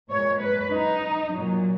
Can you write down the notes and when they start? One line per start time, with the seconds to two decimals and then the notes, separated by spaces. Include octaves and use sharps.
0.10 A#2 G#3 C#5
0.42 B4
0.73 D#4
1.34 A#2 F#3